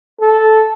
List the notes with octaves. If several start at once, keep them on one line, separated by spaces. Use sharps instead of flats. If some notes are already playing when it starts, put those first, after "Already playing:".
A4